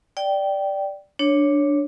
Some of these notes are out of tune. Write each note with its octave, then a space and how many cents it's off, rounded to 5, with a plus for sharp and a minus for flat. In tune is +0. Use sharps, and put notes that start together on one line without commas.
D5 +0 G5 -10
D4 +0 C#5 +0